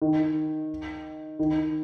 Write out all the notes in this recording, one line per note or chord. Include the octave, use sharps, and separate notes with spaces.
D#3
D#3